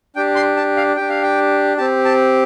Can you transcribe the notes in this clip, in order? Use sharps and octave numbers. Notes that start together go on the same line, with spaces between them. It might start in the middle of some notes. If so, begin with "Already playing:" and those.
D4 G4 G5
C6
A5
F5
D4 G4 G5
F5
G5
C4 G4 A5
A5